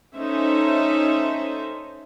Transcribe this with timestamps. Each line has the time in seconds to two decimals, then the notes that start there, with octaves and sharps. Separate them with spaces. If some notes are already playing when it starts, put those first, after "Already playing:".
0.16 C#4 D#4 A4 C5 E5